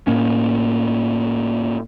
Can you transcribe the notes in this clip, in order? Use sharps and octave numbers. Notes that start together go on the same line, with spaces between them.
A2 A#3 C#4